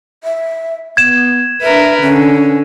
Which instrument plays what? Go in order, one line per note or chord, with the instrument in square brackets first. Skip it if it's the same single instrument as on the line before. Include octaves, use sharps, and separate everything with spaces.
[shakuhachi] E5
[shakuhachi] B3 [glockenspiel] G#6 E7
[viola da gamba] D4 A#4 B4 [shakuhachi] E5
[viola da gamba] D3 [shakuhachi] C#4